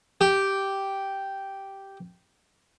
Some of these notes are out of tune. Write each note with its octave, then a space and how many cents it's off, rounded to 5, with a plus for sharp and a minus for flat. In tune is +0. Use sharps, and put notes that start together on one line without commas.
G4 -5